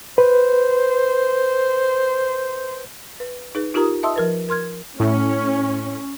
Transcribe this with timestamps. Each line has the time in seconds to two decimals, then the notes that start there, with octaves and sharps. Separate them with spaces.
0.18 B4 C5
3.20 B4
3.55 D#4 G#4 B4
3.74 D#4 F4 G4 A#4 A#5 D#6
4.03 D#5 E5 A5 C6 D#6 E6
4.16 F3 A#4 B4
4.49 A#4 C6 F6 G#6
5.00 A2 C#4